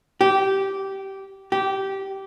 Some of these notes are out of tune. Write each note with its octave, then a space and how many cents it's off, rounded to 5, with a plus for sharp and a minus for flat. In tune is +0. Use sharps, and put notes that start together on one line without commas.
G4 -15
G4 -15